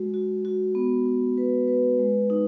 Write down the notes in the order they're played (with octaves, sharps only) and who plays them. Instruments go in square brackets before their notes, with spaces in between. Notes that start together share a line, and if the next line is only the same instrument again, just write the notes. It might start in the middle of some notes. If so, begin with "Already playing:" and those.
Already playing: [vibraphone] G#3 F#4
F#4
F#4
B3
B3
B4
B4
G#3
D#4